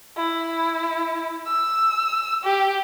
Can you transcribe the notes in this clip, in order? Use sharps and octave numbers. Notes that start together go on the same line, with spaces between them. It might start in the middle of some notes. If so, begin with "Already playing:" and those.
E4
E6
G4